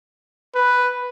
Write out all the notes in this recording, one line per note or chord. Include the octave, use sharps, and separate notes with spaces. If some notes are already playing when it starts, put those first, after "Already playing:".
B4